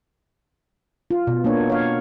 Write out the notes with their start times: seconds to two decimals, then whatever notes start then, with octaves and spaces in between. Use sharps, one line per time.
1.11 F4
1.27 B2
1.44 A#3 D4 C#5
1.70 C#5 F5